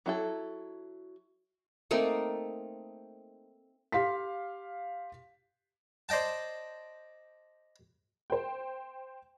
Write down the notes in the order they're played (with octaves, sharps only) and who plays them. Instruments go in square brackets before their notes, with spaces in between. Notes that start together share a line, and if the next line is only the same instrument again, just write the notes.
[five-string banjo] F#3 E4 A4
[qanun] A3 A#3 C4 D#4
[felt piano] G4 F5 C6 B6
[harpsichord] C5 D5 D#5 G5 A5
[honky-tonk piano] C5 G5